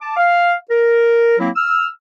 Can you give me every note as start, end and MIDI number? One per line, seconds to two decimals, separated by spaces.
0.01 0.14 81
0.01 0.14 86
0.17 0.54 77
0.70 1.37 70
1.38 1.50 54
1.38 1.50 58
1.38 1.50 60
1.38 1.50 64
1.55 1.87 88
1.55 1.87 89